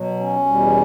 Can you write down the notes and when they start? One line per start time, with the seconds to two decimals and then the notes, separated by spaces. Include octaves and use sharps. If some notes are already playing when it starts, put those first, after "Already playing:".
Already playing: B2 F#3
0.20 C#4
0.46 E2 B2 G3